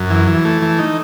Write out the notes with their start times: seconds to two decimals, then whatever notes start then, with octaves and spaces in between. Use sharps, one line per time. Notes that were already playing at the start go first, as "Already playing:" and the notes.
Already playing: F#2
0.10 E3
0.28 E3
0.45 A3
0.62 E3
0.79 D#4